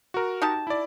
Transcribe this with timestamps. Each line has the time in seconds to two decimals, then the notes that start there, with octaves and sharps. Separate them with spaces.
0.14 F#4 A#4
0.42 D#4 G4 A5
0.67 E4 D5